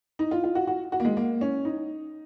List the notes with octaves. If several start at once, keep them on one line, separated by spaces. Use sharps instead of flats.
D#4
F4
F4
F#4
F#4
F#4
A#3
G#3
A#3
C#4
D#4